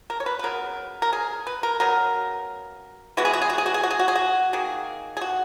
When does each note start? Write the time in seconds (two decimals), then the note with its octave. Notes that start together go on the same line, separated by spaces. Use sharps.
0.10 A#4
0.20 C#5
0.26 B4
0.39 B4
0.43 C#3 F#3 B3 A#4
1.02 A#4
1.13 G#4
1.47 B4
1.63 A#4
1.80 C#3 F#3 B3 A#4
3.17 E3 G#3 B3 F#4
3.25 G#4
3.33 F#4
3.42 G#4
3.50 F#4
3.58 G#4
3.66 F#4
3.74 G#4
3.83 F#4
3.90 G#4
3.99 F#4
4.08 G#4
4.15 F#4
4.53 D#3 A#3 G#4
5.17 G#4
5.21 F#4